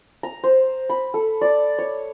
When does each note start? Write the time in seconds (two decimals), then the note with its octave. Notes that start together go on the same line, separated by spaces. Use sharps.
0.23 A#5
0.44 C5
0.90 B5
1.14 A4
1.41 D5
1.79 C#5